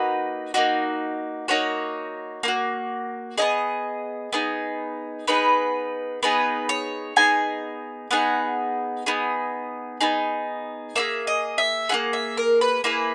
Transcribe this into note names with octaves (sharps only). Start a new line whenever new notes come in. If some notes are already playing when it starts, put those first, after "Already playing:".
Already playing: A#3 D#4 F#4 B4
A#3 D#4 F#4
A#3 D#4 F#4 C#5
A#3 D#4 F#4
B3 D#4 G#4 D#5
B3 D#4 G#4
B3 D#4 G#4 B4
B3 D#4 G#4 B4
C#5
B3 D#4 G#4 G#5
B3 D#4 G#4 F#5
B3 D#4 G#4
B3 D#4 G#4
A#3 E4 G#4 E5
D#5
E5
A#3 E4 G#4 F#5
E5
A#4
B4
A#3 E4 G#4 B4